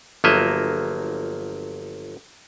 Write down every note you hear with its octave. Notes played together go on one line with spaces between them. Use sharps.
G1 F3 F#3 A#3 D#5 E5